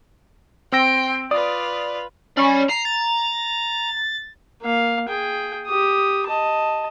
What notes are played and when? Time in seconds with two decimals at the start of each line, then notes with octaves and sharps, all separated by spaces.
0.72 C4 G5 C6 E6 A#6
1.31 F4 B4 D5 D#6
2.37 C#4 D5 B5
2.69 A#5 C7
2.85 A6
4.61 A#3 F5
5.09 G#4 G5
5.67 G4 D#6
6.27 D#5 A5